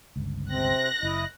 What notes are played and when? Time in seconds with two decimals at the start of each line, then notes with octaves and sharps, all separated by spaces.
0.16 G1 C#2
0.49 C3 C4 F#6 A#6
1.03 F#1 E4 D#5